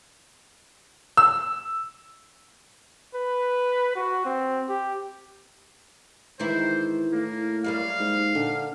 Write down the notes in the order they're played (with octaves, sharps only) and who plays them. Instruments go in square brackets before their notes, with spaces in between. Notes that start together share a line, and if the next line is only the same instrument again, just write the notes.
[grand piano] E6
[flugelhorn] B4
F#4
C4
G4
[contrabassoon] G#2 [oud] D#3 E3 E4 [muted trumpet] C5
[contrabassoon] A2 [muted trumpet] A#3
[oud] F#2 G3 A#3 [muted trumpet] F5
[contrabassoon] G#2
[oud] A#2 [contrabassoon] D3